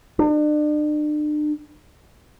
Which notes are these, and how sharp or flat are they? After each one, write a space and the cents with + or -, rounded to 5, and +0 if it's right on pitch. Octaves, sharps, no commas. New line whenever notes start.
D4 +40